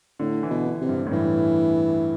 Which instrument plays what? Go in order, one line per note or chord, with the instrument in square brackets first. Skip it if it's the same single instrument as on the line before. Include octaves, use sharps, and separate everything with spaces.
[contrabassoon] A2 [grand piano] D3
[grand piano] E3
[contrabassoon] B2
[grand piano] D3
[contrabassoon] C3
[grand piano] G2
A2
[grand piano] G2 [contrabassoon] E3